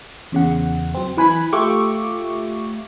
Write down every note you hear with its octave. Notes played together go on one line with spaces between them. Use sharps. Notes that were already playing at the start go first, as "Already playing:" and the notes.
E2 C#3 F#5
F#3 C4
E3 B4 G#5 B5 B6
A3 F4 G4 E5 C#6 D6